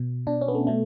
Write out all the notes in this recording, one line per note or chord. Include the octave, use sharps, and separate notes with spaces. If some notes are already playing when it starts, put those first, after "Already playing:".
Already playing: B2
B2 D4
C#4
B3
A3
B2 A3